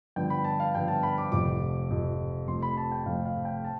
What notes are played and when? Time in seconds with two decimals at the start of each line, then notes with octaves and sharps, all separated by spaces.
0.16 G2 D3 F3 B3 G5
0.30 B5
0.44 A5
0.60 F5
0.75 G2 D3 F3 B3 G5
0.88 A5
1.03 B5
1.18 D6
1.32 F1 F2 C3 F3 D6
1.90 F1 F2 C3 F3
2.48 F2 C3 F3 A3 C4 C6
2.63 B5
2.77 A5
2.92 G5
3.05 F2 C3 F3 A3 C4 F5
3.25 F5
3.45 G5
3.64 A5